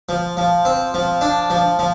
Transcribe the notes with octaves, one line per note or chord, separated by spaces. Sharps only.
F3
F3
C4
F3
D4
F3
F3